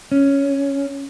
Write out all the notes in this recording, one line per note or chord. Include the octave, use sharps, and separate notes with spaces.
C#4